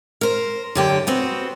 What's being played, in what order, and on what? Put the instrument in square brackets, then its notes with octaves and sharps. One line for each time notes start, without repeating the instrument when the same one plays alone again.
[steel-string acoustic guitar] A#4 C5
F#2 D3 G4
B3 C4 F#4 C5